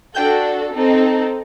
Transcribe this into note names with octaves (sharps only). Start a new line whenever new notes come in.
D4 F#4 A4 G5 G6
C4 D#4 A4